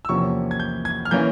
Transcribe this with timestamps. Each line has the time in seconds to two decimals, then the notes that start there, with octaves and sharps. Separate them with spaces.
0.05 E6
0.09 E2 C3 F3 A#3 C#4 C#6
0.51 G#6
0.60 G6
0.85 G#6
1.05 F6
1.11 E3 A#3 C#4 G6